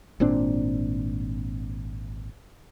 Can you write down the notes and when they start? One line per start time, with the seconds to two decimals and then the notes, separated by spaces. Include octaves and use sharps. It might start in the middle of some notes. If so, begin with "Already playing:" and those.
0.20 G#1 A#2 C4 D4